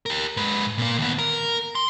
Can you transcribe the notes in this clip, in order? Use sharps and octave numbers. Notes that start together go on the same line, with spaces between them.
G4 A#4
G#2 B4
A#2 A#3
D#2 B3
A#4
C6